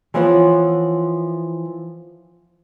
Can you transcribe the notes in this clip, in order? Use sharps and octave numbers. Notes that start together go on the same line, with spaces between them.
E3 F3 B3 C#5 F#5